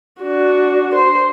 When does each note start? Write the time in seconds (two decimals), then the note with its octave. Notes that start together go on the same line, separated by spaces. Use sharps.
0.22 D4 F#4
0.94 C5